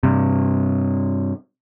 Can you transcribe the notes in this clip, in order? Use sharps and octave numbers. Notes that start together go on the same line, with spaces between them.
G2 C3